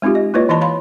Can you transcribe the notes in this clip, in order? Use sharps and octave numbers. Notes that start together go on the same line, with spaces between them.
G#3 C4 D#4 F4 G4
D#5
A#3 E4 F4 B4 C#5 D#5
E3 E4 C#5 D#5 A5 B5
C#5 F5 B5 C6